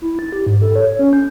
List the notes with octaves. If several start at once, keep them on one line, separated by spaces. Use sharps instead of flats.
E4
A6
G4
G#2
A4
C#5
C#5
C#4
G6